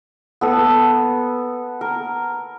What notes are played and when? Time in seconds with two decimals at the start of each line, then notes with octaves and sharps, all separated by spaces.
0.41 B3 A4 D#6
1.81 A#4